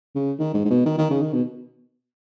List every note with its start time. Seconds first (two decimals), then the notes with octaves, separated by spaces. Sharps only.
0.15 C#3
0.39 D#3
0.54 G#2
0.65 G#2
0.70 B2
0.86 D#3
0.98 D#3
1.11 C#3
1.22 D#3
1.34 B2